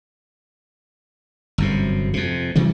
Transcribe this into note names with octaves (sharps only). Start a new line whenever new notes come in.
G1 F#2 C3
F2 C3
C3 E3 G3 B3